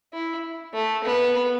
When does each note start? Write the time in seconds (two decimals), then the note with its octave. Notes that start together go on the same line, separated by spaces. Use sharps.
0.13 E4
0.74 A3
1.04 B3